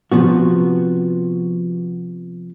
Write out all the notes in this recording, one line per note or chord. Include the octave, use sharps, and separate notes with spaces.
C3 F3 B3 F#4